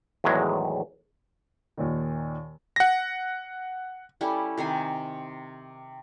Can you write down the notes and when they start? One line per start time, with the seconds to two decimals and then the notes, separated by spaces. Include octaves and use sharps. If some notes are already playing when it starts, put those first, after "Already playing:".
0.24 E2 A2 D#3 F#3 G#3
1.78 D#2 A#2 D#3
2.76 F#5 A#6
4.21 G3 C#4 E4 A4
4.58 C3 D#3 C5 G#5